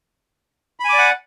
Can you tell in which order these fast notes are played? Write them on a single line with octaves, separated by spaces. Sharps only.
B5 G#5 D6 D5 F#5